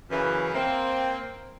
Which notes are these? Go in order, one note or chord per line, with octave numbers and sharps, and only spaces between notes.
F#2 C#3 E3
A#3 C4